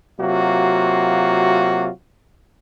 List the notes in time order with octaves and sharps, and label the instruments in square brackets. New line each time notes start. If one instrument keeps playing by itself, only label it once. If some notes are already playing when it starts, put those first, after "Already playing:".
[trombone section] C3 F#3 A#3 F4 F#4